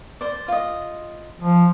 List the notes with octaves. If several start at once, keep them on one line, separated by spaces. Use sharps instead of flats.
C5 D5
F4 D#5
F3